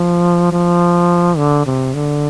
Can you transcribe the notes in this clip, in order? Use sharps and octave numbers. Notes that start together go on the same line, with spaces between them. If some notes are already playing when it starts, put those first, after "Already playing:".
Already playing: F3
F3
D3
C3
D3